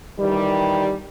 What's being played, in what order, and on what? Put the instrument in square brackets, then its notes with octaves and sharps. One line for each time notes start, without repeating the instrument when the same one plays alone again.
[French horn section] D#3 E3 G3